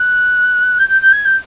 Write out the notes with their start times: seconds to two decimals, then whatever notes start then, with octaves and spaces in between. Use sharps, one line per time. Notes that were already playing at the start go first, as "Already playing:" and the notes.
Already playing: F#6
0.78 G6
0.89 G6
1.01 G6
1.12 G#6
1.25 G6